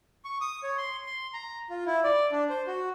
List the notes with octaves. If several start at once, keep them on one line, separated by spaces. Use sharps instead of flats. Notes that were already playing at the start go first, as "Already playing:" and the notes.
C#6
D#6
C#5
C6
C6
A#5
F4
E4
D5
D4
C5
F#4